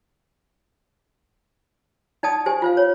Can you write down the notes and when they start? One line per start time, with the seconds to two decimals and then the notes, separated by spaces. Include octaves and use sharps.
2.23 D#4 D5 G5 A5 D#6
2.46 G4 C5 G#5
2.62 F4 C5 F5
2.77 C#5